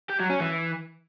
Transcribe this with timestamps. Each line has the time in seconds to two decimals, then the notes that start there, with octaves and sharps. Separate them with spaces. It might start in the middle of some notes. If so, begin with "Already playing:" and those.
0.10 G4
0.20 F#3
0.30 C#4
0.40 E3